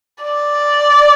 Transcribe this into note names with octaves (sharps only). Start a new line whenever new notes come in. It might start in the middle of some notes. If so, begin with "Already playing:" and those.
D5